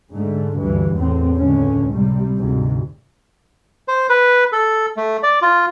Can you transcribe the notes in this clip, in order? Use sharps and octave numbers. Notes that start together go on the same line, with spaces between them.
G#2 D3 A3
D2 G2 E3
E2 A2 C4
C#2 A2 D3 C#4
C3 G3
D2 G#2 C3
C5
B4
A4
A3
D5
F4